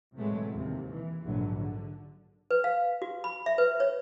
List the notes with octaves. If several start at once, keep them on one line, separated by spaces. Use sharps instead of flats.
A2 C3 E3 F#3 G#3 A3
D#2 C3
E3
A#1 G#2 D3 F#3
D3
B4
F5
F#4
B5
E5
B4
C#5